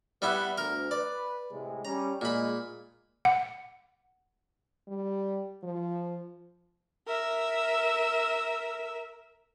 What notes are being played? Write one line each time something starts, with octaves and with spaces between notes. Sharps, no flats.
G3 B3 E4 B4 F#5
D2 A#4
B4 D5
A2 C3 G#3
G3 C#4 A#5
A#2 G#3 B5
F#5
G3
F3
A#4 E5